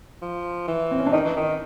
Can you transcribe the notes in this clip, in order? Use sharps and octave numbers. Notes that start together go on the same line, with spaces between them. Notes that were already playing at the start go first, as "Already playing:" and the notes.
F3
E3
C4
C#4
D4
D#3 D#4
E3
D#3